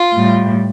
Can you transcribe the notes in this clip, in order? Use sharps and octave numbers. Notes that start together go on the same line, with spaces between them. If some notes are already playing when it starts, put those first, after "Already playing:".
Already playing: F4
A2 G3